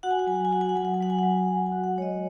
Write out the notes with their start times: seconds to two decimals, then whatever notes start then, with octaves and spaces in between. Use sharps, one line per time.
0.03 F#4 F#5
0.11 G#5
0.19 F#5
0.27 F#3 G#5
0.36 F#5
0.45 G#5
0.52 F#4 F#5
0.61 G#5
0.69 F#5
0.75 F#3 G#5
0.85 F#5
0.94 G#5
1.00 F#3 F#5
1.10 G#5
1.19 F#3 F#5
1.49 F#4
1.66 G#5
1.72 F#4
1.84 F#5
1.96 G#3 C#5
2.02 D#5